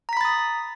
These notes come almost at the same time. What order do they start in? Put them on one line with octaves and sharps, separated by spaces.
A#5 B6 B5 A6 D#6